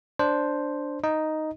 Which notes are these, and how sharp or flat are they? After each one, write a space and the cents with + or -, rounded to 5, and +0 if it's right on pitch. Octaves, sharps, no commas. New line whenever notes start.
D4 +0 C5 +0
D#4 +0 D#5 +0